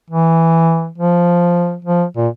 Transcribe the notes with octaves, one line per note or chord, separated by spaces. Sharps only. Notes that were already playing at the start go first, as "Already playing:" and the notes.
E3
F3
F3
A#2